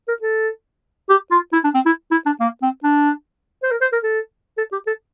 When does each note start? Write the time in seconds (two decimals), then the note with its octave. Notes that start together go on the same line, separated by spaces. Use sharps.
0.08 A#4
0.22 A4
1.09 G4
1.31 F4
1.53 E4
1.64 D4
1.75 C4
1.86 E4
2.11 E4
2.26 D4
2.40 A#3
2.62 C4
2.84 D4
3.63 C5
3.71 A#4
3.81 C5
3.93 A#4
4.03 A4
4.58 A4
4.72 G4
4.87 A4